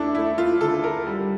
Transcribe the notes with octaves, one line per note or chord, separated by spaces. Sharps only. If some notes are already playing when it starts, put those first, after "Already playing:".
Already playing: A3 D4 E4 A4
A3 E4
F4
D3 A4
A#4
G3